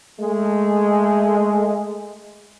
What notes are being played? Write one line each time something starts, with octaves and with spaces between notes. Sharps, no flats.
G#3 A3